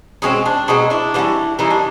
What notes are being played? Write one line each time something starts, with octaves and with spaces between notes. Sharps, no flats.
B2 G#3 C4 C#4 D#4
D4
B2 G#3 C4 D#4
D4 E4
E3 G3 A#3 C#4
E3 G3 A#3 C#4 D#4
D4